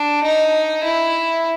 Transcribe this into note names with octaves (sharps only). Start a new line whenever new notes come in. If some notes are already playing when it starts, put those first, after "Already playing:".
Already playing: D4
D#4
E4